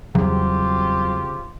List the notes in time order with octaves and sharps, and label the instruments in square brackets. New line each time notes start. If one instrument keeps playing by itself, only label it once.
[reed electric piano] E2 G3 [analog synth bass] C#3 [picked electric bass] F#3 [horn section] C4 F4 G4